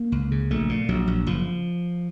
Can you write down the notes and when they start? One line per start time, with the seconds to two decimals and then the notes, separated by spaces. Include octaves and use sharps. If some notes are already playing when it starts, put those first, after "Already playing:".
Already playing: A#3
0.12 C#2
0.31 C#3
0.51 A#1 A3
0.69 A#2
0.89 A#1 F#3
1.07 A#1
1.27 F#1 F3